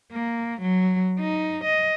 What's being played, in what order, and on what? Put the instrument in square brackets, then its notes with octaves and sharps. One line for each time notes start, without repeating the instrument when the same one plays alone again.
[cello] A#3
F#3
D#4
D#5